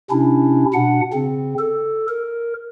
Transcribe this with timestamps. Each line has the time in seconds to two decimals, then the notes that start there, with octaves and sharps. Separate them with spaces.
0.11 C3 C#4 D4 E4
0.74 B2 D4 F#5
1.13 C#3 C4
1.59 A4
2.09 A#4